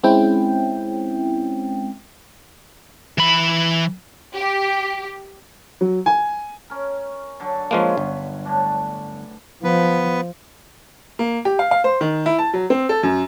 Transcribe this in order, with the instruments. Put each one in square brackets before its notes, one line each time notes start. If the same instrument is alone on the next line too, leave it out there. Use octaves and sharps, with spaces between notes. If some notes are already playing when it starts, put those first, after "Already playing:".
[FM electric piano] G#3 C4 C#4 E4 G5
[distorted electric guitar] E3 B5
[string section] G4
[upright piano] F#3
G#5
[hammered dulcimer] C#4 A#4
D3 F#3 A4
[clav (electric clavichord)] F3 G#3 A#3 [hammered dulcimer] C#4 B4 C6
[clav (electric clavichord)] G1
[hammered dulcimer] A2 D3 D4
[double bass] F3 [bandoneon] B3 B4
[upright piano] A#3
G4
F5
F5
C5
D#3
E4
A5
F#3
C4
A4
F#2